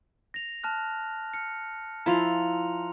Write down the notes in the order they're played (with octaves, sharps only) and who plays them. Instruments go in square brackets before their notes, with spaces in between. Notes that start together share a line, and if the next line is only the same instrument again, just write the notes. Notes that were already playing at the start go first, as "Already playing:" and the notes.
[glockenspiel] A#6 F7
A5 F6 F#6
F6 C#7
[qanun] F3 E4 [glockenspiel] A#5 C6 F7